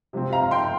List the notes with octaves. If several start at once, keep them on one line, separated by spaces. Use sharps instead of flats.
C3 F3 C4
F5 A#5
G5 C6